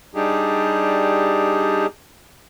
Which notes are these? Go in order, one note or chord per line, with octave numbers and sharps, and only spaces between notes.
G3 D4 D#4 G4 G#4